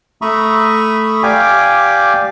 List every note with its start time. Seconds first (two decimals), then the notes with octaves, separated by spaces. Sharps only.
0.22 A3 E5 A#5 B5 C#6 D#6
1.23 G4 D5 F5 G5 G#5 D6